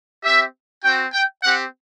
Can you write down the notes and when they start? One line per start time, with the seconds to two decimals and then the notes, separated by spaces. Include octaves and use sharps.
0.24 C4 G4 E5
0.84 C4 F#4 G5
1.13 G5
1.43 C4 G4 F#5